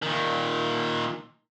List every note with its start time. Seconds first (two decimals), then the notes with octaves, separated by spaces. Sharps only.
0.02 A#2 D#3